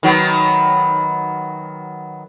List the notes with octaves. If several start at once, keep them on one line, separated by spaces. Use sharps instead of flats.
D#3 F#3 B3